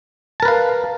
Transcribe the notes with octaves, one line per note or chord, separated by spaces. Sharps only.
A#4 B4 F5 A5